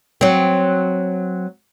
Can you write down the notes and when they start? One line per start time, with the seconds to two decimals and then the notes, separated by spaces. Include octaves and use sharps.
0.21 F#3 C4